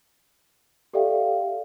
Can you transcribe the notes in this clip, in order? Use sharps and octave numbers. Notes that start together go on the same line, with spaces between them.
G4 A4 D5 E5 F5 G5